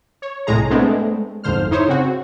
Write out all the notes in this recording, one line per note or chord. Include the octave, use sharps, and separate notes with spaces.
C#5
C2 A2 G#3 G#4 A#5
G#3 A3 B3 C4 D4
G1 F2 G#2 D3 C5 F6
D#4 E4 C5 C#5
C#3 C4 F#4